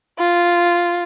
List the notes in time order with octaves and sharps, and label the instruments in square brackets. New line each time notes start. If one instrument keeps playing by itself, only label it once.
[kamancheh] F4